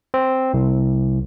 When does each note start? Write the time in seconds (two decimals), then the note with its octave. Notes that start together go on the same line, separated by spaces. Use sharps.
0.14 C4
0.54 C2